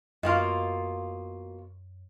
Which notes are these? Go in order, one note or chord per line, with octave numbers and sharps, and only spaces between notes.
F#2 B2 A#3 F4 D#5 C6 C#6